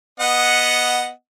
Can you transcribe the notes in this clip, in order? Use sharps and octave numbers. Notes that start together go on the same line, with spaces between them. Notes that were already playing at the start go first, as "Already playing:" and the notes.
B3 D#5 F#5